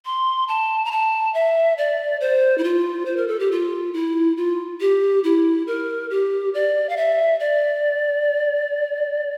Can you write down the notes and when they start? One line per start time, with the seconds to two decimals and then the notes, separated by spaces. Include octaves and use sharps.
0.05 C6
0.48 A5
0.85 A#5
0.92 A5
1.34 E5
1.78 D5
2.21 C5
2.58 E4
2.64 F4
3.06 C5
3.17 A#4
3.28 A4
3.40 G4
3.51 F4
3.94 E4
4.37 F4
4.81 G4
5.24 E4
5.67 A#4
6.10 G4
6.54 D5
6.89 F5
6.97 E5
7.40 D5